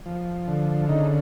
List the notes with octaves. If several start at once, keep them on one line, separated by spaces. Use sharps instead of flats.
F3
D3
C#3 D#4